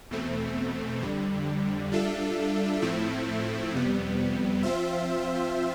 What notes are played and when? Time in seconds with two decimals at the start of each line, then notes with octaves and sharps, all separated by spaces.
0.11 E2 B2 A3 C4
1.02 F2 D3 G3
1.92 G3 D4 F4 A4 E5
2.82 A2 F3 A3 C4 E4
3.72 F2 C3 G3 B3
4.63 F3 C4 F4 C5 E5